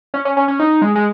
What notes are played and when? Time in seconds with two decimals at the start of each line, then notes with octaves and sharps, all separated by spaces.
0.14 C#4
0.25 C#4
0.37 C#4
0.48 C#4
0.59 D#4
0.82 G#3
0.95 G#3